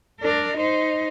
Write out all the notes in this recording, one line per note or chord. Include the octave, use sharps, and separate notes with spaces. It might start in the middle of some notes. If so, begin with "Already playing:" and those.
D4 A#4
D#4 C5